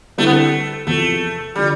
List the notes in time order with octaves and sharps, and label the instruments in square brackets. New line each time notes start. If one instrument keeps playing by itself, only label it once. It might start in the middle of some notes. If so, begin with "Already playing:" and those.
[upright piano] D3 G3 C4 E4 [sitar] A3
[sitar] B3
A3
[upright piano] E2 C3 F3 [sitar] A3
[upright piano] D3 F3 [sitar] G3